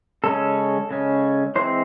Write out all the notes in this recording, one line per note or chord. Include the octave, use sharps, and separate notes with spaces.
C#3 G#3 C#4 A4
C#3 G#3 C#4
E3 G#3 C4 C5